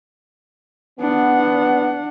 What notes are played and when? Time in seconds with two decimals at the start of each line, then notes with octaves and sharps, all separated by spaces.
1.00 B3 D4 F#5